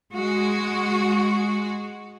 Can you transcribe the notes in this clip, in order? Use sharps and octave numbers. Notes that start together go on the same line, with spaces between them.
G#3 F#4